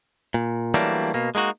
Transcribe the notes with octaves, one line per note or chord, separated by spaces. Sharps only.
A#2
E3 F#3 G3 A3 A#3 D4
B2 A#3
G#3 A#3 D#4 F#4